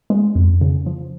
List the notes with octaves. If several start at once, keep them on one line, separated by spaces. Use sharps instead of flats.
G#3
F2
C#3
F3